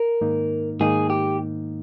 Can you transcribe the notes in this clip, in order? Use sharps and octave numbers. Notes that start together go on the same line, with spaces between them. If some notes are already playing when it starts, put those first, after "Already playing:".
Already playing: A#4
G#2 D#3 A#3 D#4
G#2 D#3 A#3 D#4 G#4
G4